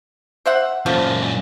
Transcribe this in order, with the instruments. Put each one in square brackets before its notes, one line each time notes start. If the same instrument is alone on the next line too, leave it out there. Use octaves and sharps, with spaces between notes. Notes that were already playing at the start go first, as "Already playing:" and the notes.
[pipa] C5 E5 F#5
[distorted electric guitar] F#2 A#2 [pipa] F3 A3